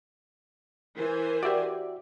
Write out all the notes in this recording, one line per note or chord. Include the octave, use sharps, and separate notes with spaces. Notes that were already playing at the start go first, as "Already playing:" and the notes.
E3 A#4 C5 G#5
F#4 G4 D5 E5